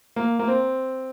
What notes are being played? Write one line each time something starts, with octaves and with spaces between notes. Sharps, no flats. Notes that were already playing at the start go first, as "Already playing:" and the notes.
A#3
A#3
C4